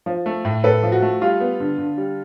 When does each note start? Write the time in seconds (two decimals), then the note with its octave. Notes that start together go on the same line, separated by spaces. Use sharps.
0.06 F3
0.26 A3
0.45 A2
0.64 A2 A4 B4
0.83 F3
0.92 F#4
1.02 A3
1.21 G3 F4
1.40 B3
1.60 D3
1.78 D3
1.98 G3